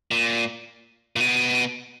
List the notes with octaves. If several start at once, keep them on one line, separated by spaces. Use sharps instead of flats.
A#2
A#2
B2